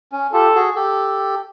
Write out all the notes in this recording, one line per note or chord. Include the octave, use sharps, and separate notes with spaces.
C#4
F4 G4 A4
F#4 G#4
G4 A4